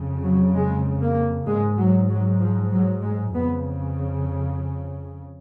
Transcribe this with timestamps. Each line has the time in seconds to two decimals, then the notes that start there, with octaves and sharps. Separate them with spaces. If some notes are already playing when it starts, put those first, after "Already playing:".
Already playing: F2 C#3
0.23 F#3
0.55 G#3
1.01 A#3
1.47 G#2 G#3
1.78 F#3
2.10 F#3
2.41 F3
2.72 F#3
3.02 G#3
3.33 F2 C#3 B3